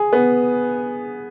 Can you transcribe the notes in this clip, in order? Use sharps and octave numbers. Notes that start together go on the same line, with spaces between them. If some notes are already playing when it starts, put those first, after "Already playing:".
Already playing: G#4
B3